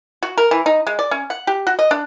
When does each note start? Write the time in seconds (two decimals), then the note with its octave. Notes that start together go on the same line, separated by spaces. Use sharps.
0.23 F#4
0.38 A#4
0.51 E3
0.66 D#4
0.87 G#3
0.99 D5
1.11 C#4
1.30 F#5
1.47 G4
1.67 F#4
1.79 D#5
1.91 D4